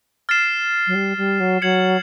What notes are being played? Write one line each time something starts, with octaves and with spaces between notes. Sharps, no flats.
F6 A6 C7 E7
F#3
G3
G3
F#3
F#3 G#6 C#7 F#7